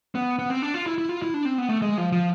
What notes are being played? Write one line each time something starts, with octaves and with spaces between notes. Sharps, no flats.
B3
B3
C4
D4
F4
E4
E4
F4
E4
D4
C4
B3
A3
G#3
F3
F3